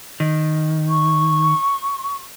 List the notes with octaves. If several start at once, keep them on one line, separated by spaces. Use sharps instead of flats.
D#3
C#6